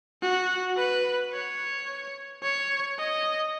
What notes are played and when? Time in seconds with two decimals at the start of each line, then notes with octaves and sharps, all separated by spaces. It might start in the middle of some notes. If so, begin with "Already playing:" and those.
0.22 F#4
0.77 B4
1.33 C#5
2.43 C#5
2.98 D#5